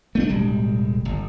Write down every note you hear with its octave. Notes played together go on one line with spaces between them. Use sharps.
A3 C4 D4
D1 B1 G3 G#3
G1